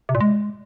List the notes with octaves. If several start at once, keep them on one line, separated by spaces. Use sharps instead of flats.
C3
A#2
G#3